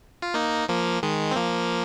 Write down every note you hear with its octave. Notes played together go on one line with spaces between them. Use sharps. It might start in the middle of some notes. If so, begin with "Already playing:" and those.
F4
A#3 D#4
F3 A#3
D#3 G#3
C4
F3 A#3